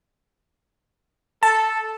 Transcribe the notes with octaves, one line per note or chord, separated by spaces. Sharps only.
A4 A5